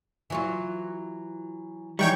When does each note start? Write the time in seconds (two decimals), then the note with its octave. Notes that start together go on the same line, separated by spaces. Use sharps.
0.30 E3 F#3 F4
1.99 E3 F#3 G3 D#4 C#5 G5 C#6